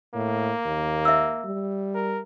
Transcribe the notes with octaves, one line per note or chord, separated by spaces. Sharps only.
A2 A#3
D#2
E5 E6
G3
A#4